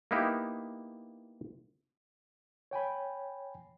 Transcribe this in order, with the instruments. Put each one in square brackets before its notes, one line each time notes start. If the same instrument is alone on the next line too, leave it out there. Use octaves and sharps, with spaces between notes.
[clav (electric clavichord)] A#3 B3 D#4 E4 G4
[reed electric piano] C#5 G5 G#5 B5